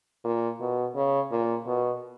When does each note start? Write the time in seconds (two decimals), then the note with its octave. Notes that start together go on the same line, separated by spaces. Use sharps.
0.24 A#2
0.60 B2
0.96 C#3
1.31 A#2
1.66 B2